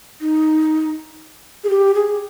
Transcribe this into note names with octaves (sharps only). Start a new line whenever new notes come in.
D#4
G#4
G4
G#4